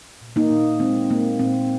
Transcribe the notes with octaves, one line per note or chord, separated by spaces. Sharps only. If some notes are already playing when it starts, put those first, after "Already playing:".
A#2
A#3 D#4
A#2
G#3 C4
A#2 A#3
A#2 C4